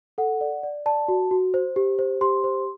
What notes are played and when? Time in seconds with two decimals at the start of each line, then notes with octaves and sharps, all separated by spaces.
0.18 A4 F#5
0.41 D5
0.63 D5
0.86 D5 A5
1.08 F#4
1.31 F#4
1.54 C5
1.76 G4
1.99 C5
2.21 G4 C6
2.44 C5